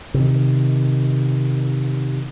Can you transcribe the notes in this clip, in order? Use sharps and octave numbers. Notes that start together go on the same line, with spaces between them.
C3 D#3